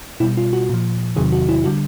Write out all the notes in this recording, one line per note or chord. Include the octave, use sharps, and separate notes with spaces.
B2 G3 E4
F4
F#4
A#2 F3
E2 C3 D#3 F#3 G#4
F#4
E4
D3 G3 F#4